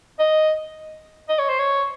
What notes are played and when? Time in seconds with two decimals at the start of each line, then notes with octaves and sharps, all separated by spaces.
0.20 D#5
1.29 D#5
1.39 C#5
1.49 C5
1.59 C#5